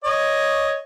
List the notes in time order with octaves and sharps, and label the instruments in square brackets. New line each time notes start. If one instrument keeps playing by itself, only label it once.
[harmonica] C#5 D#5